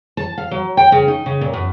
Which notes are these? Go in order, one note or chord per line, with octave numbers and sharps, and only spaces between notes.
A5
F5
F#3
G5
C#3
D#4
C#3
A#2
F#2